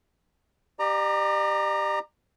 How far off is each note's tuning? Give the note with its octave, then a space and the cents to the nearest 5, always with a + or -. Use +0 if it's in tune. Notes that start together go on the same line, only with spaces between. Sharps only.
G4 +0 D5 +40 A#5 +0